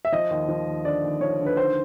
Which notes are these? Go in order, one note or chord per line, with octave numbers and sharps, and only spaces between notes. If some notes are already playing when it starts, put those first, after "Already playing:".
E5
F3 D#5
D#2
F3
D#2
D3 D5
D#2
F3 C#5
D3
B4
D#3 C5